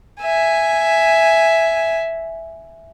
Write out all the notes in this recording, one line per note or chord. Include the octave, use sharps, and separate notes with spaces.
E5 G#5